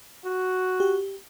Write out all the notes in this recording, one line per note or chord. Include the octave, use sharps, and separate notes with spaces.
F#4
G4